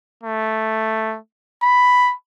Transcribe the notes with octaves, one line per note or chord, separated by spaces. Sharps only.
A3
B5